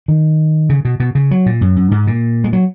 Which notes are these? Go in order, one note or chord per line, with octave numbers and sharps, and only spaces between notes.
D#3
C#3
B2
B2
C#3
F#3
A#2
F#2
F#2
G#2
A#2
G#3
F#3